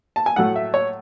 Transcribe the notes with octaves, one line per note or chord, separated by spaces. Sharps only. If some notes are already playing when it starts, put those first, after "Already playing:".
A5
G#5
A2 F#3 A3 F#5
E5
C#5